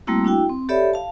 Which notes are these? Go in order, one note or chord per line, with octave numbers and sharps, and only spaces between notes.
G3 A3 A#3 C4 E4 F#4
D4 E4 F#4 G5
C4
G4 A4 C#5 D5 E5 B5
F5 A5